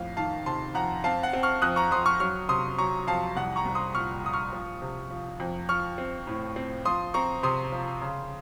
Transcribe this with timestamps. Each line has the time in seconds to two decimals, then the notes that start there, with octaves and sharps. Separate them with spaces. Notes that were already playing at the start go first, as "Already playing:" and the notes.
Already playing: F2 A2 F5
0.17 D#3 F5 A5
0.46 C3 A5 C6
0.75 F2 F#5 A#5
1.04 C4 F5 A5
1.23 F#5
1.33 C4
1.43 C#6 F6
1.62 F2 D#6 F#6
1.76 A#5 C#6
1.91 F2 C6 D#6
2.06 C#6 F6
2.20 F#3 C#6 F6
2.49 C3 C6 D#6
2.78 F#3 A#5 C#6
3.07 F2 F5 A5
3.36 C2 F#5
3.56 A#5 C#6
3.66 C2
3.75 C6 D#6
3.95 A#2 C#6 F6
4.24 A#2 D#6
4.33 C#6 F6
4.53 F3
4.82 C3
5.11 F3
5.40 F2
5.69 F3 C#6 F6
5.98 C4
6.27 A2
6.56 C4
6.85 F3 C6 D#6
7.14 C4 A#5 C#6
7.43 C3 C6 D#6
7.72 F3
8.02 C#3